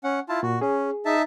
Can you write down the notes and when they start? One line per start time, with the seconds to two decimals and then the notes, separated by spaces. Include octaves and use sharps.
0.04 C#4 F#5
0.29 E4 F4 A5
0.43 A#2 F#4
0.61 C#4 G#4
1.05 D#4 E5 A5